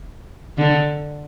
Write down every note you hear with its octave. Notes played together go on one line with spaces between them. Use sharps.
D3